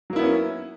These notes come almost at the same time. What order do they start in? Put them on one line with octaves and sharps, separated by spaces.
F#3 A#3 E4 B3 C#4